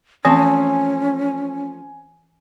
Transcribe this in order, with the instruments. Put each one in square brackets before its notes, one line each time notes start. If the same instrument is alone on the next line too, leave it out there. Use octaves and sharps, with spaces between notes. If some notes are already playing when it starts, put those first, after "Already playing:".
[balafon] E3 [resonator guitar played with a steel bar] F3 A3 C4 [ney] C#4 [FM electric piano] G#5